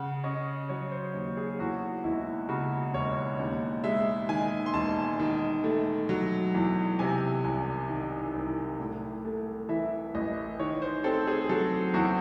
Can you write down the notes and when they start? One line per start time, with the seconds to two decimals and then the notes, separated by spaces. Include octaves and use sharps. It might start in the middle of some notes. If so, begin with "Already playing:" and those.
Already playing: C#3 F#5
0.24 C#4 D#5
0.69 F#3 C#5
0.91 C5
1.14 D#2
1.37 G#4
1.59 E2 F#4
2.04 E1 E4
2.49 C#3 F#4
2.94 E1 C#5
3.39 D#2
3.84 G#3 E5
4.29 D#3 G#5
4.66 C6
4.74 E1 A5
5.20 D#3
5.64 A3
6.09 F#3
6.54 E2
6.99 C3 G#5
7.44 C2 G#5
7.90 D#3
8.34 C2
8.80 A2
9.25 A3
9.69 E3 E5
10.15 A1 D#5
10.59 D#3 C#5
10.82 C5
11.04 C4 A4
11.27 G#4
11.49 F#3 A4
11.94 E2 F#4